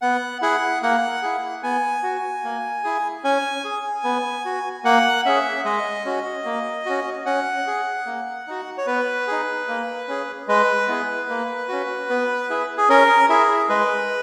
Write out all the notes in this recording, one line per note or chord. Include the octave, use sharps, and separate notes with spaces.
B3 F#5
E4 G#4 F#5
A#3 F#5
E4 G#4
B3 G#5
F#4
A#3
E4 G#4
C#4 G#5
G#4
B3
F#4
A#3 F#5
C#4 G#4 E5
G#3 D#5
C#4 F#4
A#3
C#4 F#4
C#4 F#5
G#4
A#3
D#4 F#4
C#5
B3 B4
D#4 G#4
A#3
C#4 G#4
G#3 B4
B3 E4 G#4
A#3
C#4 F#4
B3
E4 G#4
G#4
C#4 A#4
E4 G#4
G#3 B4